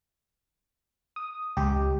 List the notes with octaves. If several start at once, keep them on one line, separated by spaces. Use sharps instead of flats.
D#6
C#2 G4